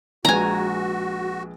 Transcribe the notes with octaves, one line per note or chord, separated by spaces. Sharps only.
A#1 G#3 F#4 B4 G#5 A#5